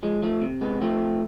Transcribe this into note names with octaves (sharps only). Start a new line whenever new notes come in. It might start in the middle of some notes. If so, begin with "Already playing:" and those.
F3 G#3
F3 A3
C3
G#3 B3
F3 A3 C4